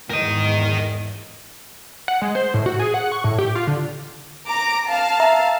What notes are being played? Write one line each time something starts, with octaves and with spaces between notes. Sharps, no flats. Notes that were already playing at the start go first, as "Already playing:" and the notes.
E2 G#2 A#4 D#5
F#5
G#3
C5
A2
F#4
G#4
F#5
C#6
A2
G4
F4
D3
A#5 D6
F5 A5
E5 A#5